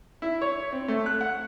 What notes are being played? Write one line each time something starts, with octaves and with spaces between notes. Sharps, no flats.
E4
C#5
C4
A3
F#6
F#5